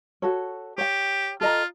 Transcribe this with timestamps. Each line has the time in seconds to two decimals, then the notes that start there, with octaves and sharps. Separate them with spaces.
0.22 F#4 A4 C#5
0.78 G4 C#5 G5
1.41 F4 A4 D#5 A#5